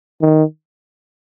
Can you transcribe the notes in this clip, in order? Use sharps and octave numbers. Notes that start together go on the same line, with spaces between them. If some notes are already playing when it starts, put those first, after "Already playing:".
D#3